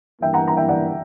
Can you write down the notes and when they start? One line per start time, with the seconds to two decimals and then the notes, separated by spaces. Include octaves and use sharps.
0.22 G2 E3 A#3 E4 E5 G5
0.34 F#5 A#5
0.47 A#5
0.57 E5 G5
0.69 D5 F#5